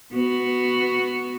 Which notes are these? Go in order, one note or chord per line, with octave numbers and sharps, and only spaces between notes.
B3 F#4